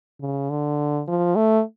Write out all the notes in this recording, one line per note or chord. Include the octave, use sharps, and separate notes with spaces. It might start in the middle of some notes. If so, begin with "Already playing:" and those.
C#3
D3
F3
A3